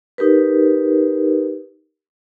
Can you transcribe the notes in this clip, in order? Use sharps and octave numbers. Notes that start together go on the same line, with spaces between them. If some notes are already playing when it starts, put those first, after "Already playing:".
D#4 G4 A#4 B4